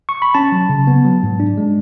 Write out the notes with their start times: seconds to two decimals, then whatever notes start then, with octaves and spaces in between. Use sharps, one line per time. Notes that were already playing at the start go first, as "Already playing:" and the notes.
0.09 C#6
0.22 B5
0.34 C#4 A5
0.52 F#3
0.69 C#3
0.87 B3
1.05 F#3
1.23 G#2
1.40 D4
1.58 G#3